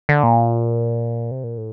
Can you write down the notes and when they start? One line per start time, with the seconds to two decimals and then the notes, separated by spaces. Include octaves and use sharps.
0.09 D3
0.23 A#2
1.31 C3
1.44 A#2
1.58 A2